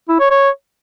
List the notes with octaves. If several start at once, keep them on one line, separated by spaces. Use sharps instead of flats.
E4
C#5
C#5